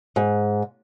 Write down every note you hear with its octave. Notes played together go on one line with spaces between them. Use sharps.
G#2